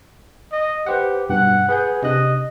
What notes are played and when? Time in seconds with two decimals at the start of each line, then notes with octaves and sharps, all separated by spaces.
0.52 D#5
0.86 G4 B4 C5 F#5
1.30 G2 B2 F#5
1.69 G#4 B4 F#5 G6
2.02 C3 D4 D#5 F#6